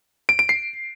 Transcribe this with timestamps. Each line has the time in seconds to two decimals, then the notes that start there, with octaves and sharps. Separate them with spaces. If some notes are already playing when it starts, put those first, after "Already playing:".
0.29 D7
0.39 D7
0.49 C7